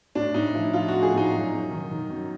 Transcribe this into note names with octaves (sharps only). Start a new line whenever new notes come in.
A2 D4
A2 D#4
F3 E4
F3 F4
A2 F#4
G#4
A2 D#4
F#2
F#2
D#3
D#3
F#2